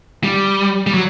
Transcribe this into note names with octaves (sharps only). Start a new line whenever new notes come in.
G3
G3
F#3